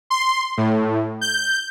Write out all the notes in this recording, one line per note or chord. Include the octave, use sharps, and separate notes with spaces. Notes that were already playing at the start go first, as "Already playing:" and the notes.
C6
A2
G6